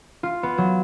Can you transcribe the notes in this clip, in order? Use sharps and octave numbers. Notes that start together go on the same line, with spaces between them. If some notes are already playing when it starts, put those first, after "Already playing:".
F4
B3
F#3